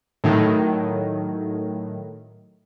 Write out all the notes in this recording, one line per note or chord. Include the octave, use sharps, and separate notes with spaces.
A2 D#3 F#3